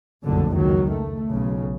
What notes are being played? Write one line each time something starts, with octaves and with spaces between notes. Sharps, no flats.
F#1 B1 F2 A2 D3
C#2 D#3 F#3
A3
B1 C#3